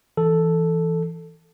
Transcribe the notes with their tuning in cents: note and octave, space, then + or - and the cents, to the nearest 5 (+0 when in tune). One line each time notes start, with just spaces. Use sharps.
E3 +0 A4 +0